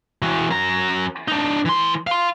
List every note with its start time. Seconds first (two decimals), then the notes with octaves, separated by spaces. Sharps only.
0.22 E3 F#4
0.50 F#2 A#5
1.28 D4 D#4
1.65 E3 C6
2.07 F5 C6